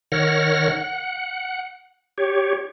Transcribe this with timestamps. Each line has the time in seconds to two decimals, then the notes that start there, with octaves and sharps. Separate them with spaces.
0.12 D#3 C#5 F#5 F6 A#6
0.69 F#5
2.18 G4 C#5